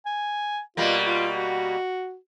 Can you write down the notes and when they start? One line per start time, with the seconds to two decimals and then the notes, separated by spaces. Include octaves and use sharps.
0.06 G#5
0.77 B2 G3 A#3 F4
1.05 F4
1.34 F#4